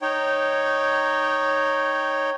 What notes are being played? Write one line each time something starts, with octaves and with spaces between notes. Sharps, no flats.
D#4 C#5 G5